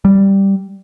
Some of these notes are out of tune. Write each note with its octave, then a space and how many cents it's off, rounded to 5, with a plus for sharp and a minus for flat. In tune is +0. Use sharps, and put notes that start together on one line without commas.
G3 +0